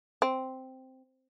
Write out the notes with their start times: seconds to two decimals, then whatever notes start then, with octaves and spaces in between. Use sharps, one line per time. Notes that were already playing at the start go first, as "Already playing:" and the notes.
0.22 C4